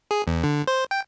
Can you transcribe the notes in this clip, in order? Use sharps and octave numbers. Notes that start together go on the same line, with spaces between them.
G#4
E2
D3
C5
G5